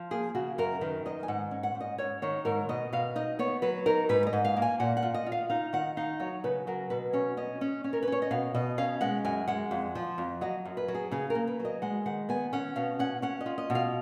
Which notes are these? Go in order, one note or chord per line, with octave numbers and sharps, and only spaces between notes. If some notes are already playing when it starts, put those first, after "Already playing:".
Already playing: F3
A#3 G#4
C#3 F#4
F#2 A#4
D#3 B4
F#2 D#5
G#5
G#2 F#5
C#4
F#5
G#2
D#5
G#2 C#5
D#3 C#5
G#2 A#4
B2 D#5
B2 F5
D#4 D#5
B3 C#5
F#3 B4
D#4 A#4
G#2 B4
D#5
G#2
F5
A#3
G#5
A#2 F#5
F#5
F4
D#5
F4
F5
D#4 F5
D#3 F#5
D#4 F5
F#3 C#5
C#3 B4
F#3 A#4
B2 B4
C#4 C#5
C#4 D#5
C#4
C#4
A#4
B4
C#4 C#5
D#5
B2 F5
B2 D#5
C#4 F5
G#3 F#5
F#2 G#5
G#3 F#5
F2
F3
F2
F#3 D#5
F#2
B4
F#3
G#4
C#3 G#4
A#4
A#3
B4
F#3
D#5
G#3 F#5
D#3 F#5
B3 G#5
C#4 F#5
B2 F5
C#4 F#5
C#4 F#5
D#5
F4
D#5
B2
F5